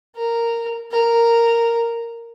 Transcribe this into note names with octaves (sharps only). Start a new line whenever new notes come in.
A#4
A#4